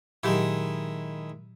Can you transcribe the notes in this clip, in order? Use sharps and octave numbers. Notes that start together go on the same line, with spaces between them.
A#2 D#3 F#3 G#3 E4 G4